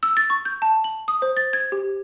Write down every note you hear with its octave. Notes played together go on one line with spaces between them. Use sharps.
E6
A6
C#6
G6
A5
F#7
D#6
C5
A6
G#6
G4